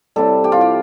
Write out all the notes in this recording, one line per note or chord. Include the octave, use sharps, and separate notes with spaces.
C3 G3 A4
G4
F4
G4